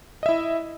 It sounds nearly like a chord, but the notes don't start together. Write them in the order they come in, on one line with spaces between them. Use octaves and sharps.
D#5 E5 E4